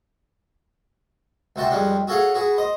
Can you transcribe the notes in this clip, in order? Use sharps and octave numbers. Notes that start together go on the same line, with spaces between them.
C#2 C3 F#4 C5 A5
F2 G3 G#3 C#4 D4
F#4 G#4 A4 C#5 F5 F#5
F#4 G#4 B4
C5 D#5